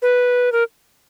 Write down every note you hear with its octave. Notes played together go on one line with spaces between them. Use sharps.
B4
A#4